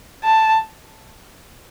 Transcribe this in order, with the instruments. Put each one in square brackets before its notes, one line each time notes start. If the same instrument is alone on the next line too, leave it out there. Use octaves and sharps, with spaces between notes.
[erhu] A5